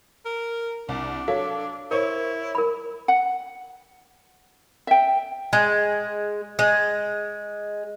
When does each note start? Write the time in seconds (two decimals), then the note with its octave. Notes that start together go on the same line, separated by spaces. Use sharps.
0.25 A#4
0.89 C2 D4
1.28 F#3 A4 C#5 F5
1.91 E4 A#4 C5 C#5 C#6
2.55 A#4 B5
3.08 F#5
4.87 E5 G5
5.53 G#3
6.59 G#3